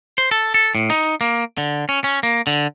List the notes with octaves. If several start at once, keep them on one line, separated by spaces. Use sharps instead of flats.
C5
A4
A4
A2
D#4
A#3
D3
C#4
C#4
A#3
D3